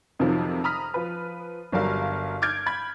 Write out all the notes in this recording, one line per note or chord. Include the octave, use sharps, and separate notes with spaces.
F2 C3 D#3 F3 F#3
A#5 B5 D#6 F6 B6
F3 B4
G1 F#3 G3 A#4 F5
D6 F6 G6 G#6 D7
B5 G#6